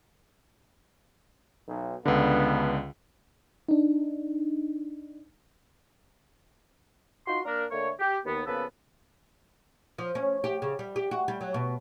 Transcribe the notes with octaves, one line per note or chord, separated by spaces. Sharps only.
B1
C#2 G2 D3 B3
D4 D#4
D#4 F4 F#4 C6
A#3 D4 A#4
D3 A3 A#3 C#5
G4
D#2 B3
C#3 F3 A#3 B3 A4 B4
F3
C#4
G4
C#3
G3
G4
F#4
G3
F#3
B2